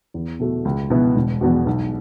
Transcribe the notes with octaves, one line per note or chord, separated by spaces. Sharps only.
E2
B2 A3 F#4
C#2
B2 B3 E4
E1
E2 B2 B3 F#4
B1